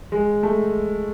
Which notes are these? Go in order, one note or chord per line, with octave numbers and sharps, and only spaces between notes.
G#3
A3